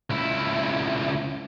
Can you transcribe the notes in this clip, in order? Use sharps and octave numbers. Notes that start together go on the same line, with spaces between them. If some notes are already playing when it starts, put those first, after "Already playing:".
C#2 E4